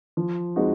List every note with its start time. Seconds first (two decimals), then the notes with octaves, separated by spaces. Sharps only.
0.17 F3
0.56 G#3 C4 D#4 F#4